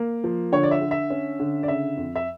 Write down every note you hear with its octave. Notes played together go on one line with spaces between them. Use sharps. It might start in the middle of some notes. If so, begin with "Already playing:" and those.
Already playing: A#3
F3
D3 C#5
D5
E5
D3
E5
C#4
D3
D5
C#3 E5
F2
E5